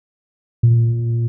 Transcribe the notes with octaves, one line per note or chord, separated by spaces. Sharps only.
A#2